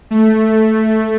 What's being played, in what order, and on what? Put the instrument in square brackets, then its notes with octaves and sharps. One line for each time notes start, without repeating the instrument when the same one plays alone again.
[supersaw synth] A3